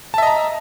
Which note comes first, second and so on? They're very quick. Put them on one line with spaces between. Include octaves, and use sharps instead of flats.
A5 E5 D#5 A#5